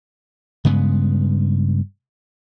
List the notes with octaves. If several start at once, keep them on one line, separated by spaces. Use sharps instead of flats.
G2 C#3 G#3 B3